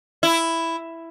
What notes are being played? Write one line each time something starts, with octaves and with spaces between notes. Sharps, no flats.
E4